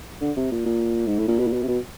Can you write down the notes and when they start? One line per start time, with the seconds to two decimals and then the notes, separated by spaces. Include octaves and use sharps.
0.21 D3
0.37 C3
0.52 A#2
0.66 A#2
1.07 G#2
1.19 A2
1.28 A#2
1.39 B2
1.47 A#2
1.53 B2
1.63 C3
1.68 B2